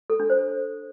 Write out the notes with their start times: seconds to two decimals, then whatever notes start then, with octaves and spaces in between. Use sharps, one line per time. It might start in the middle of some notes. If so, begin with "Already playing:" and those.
0.10 A4
0.20 D4
0.30 C5